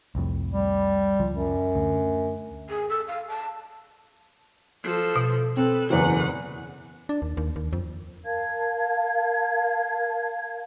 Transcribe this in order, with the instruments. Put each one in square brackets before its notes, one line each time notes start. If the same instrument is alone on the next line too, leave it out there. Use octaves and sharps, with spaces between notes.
[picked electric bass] C2 F2 A2
[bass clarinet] G3
[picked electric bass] C#2 F3
[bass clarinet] F#2
[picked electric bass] D2
[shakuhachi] G#4
A4
F5
A5
[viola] F3 A4
[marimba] B2
[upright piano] C4 [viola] A4 B4
[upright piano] F#1 E2 [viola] B4 F#5
[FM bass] D4
D#2
D#2
D#2
F2
[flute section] A#4 F5 A5 G#6